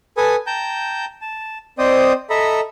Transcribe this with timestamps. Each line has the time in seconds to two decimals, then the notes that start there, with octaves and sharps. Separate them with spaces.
0.17 A4 B4 G#5 D#6
0.47 G5 A5 A#5 G6
1.21 A5
1.78 C4 C5 D5 D#5 G5 D#6
2.30 A4 D#5 E5 A#5 B5